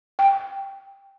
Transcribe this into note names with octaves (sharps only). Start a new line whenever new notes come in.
G5